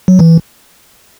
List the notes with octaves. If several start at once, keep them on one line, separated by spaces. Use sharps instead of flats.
F#3
E3